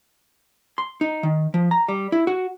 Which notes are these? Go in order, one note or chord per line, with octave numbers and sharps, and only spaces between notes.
C6
D#4
D#3
F3
A#5
G3
E4
F#4